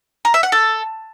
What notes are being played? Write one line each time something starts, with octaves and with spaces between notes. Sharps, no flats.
A#4
E5
F#5
A4